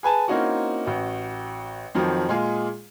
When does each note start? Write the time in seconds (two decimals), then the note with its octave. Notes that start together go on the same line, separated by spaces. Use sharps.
0.03 G#4 B4 G#5 A5
0.28 A#3 C4 C#4 D#4 E4 F#4
0.85 A1 F#4
1.95 F2 D#3 F3 F#3
2.28 A#2 G#3 F4 G#4